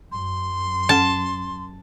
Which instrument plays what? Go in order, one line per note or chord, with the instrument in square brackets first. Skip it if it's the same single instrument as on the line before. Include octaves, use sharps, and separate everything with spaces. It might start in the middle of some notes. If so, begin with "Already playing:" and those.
[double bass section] F#2 [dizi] C6
[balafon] C#4 A4 F#5 [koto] A5